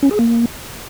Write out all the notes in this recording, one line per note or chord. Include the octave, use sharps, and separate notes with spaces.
C#4
G#4
A#3